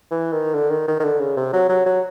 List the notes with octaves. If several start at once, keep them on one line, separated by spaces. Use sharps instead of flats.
E3
D#3
D3
D#3
D#3
D#3
D3
C#3
C3
F#3
F#3
F#3